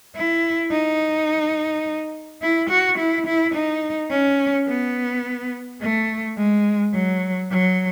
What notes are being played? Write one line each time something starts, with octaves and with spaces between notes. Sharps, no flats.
E4
D#4
E4
F#4
E4
E4
D#4
C#4
B3
A3
G#3
F#3
F#3